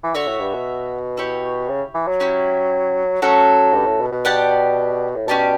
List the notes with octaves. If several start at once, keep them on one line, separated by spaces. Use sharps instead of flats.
E3
D3 F#4 C#5 E5
A2
G2
B2
E4 G4 C#5
C#3
E3
F#3
C#4 E4 G4
F#3 A3 C#4 F#4 A4
G2
A2
B2
B2
G4 D5 F#5 A5
A2
B2 C#4 G4 D5 A5